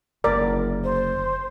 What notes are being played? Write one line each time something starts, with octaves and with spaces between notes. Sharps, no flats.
F#1 D3 A#4 D5
C5